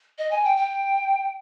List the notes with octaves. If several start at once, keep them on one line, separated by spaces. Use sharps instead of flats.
D#5
G#5
G5
G5